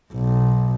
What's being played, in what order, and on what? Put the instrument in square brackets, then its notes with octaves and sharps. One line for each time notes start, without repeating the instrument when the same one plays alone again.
[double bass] B1